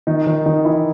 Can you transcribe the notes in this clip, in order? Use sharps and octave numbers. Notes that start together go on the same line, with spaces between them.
D#3 D#4
D#3 D#4
D#3 D#4
E3 E4